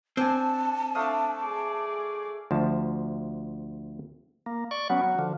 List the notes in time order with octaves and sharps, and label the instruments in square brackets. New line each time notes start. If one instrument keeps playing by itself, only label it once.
[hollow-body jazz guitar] C4 [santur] D4 G#5 [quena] A5
[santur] A3 F5 D#6 [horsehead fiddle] D4
[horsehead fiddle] G#4 D5
[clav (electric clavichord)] D2 F3 A5
[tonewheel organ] A#3
D5 C#6
[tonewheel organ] F#3 B3 C#4 [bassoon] F#4
[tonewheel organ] F#3
D3 F3